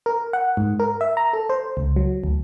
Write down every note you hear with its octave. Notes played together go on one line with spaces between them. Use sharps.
A#4
F#5
G#2
A#4
E5
A#5
A4
C5
C#2
F#3
D2